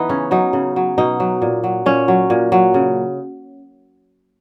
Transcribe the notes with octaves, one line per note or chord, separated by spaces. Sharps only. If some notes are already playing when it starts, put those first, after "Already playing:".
Already playing: E3 B3 D#4
C#3 C#4
F#3 D#4
C#3
F#3
B2 D#4
F#3
A#2
F#3
A#2 C#4
F#3
A#2
F#3
C#3